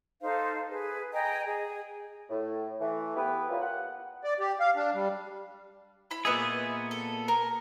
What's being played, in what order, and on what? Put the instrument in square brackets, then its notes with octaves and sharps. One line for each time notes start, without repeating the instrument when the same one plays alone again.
[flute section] D#4 A4 C5 F5
G#4 B4
D#5 G5 G#5 A#5
G#4
[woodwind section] A2
E3 A3
B3 E4 G4 B4
A#2 C#3 E3 G3 A#3 F4
F#5
[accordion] D5
G4
F5
D4
G3
[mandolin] E4 B5
[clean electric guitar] A#2 B3 G#4 [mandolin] B4 D#5 E5
[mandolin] A4
A#4